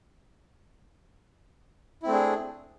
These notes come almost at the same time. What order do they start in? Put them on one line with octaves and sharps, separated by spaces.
E4 C4 A3 D4 G#4